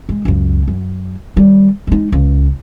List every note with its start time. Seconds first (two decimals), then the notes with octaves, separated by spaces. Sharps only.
0.09 G#3
0.25 C#2 F#2
0.68 F#2
1.36 D#3 G3
1.87 G#3 D#4
2.12 C#2